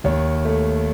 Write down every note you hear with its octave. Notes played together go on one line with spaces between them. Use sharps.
D#2 C#5
A3